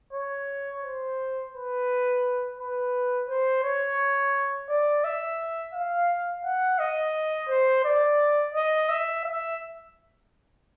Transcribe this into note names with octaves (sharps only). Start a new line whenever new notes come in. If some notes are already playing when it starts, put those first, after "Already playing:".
C#5
C5
B4
B4
C5
C#5
D5
E5
F5
F#5
D#5
C5
D5
D#5
E5
E5